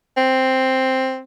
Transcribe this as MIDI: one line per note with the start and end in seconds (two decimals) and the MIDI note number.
0.17 1.21 60